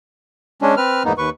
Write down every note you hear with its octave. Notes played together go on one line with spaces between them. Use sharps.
G#3 C#4 D4
C4 B4 F6
E2 G#2 A#3 B3 D#4
D#2 B4 C#6